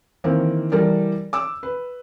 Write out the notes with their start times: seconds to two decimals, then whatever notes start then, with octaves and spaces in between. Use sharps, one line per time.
0.24 D#3 E3 A#3 C4
0.72 E3 G3 A4 A#4 D5
1.33 D6 E6
1.63 B4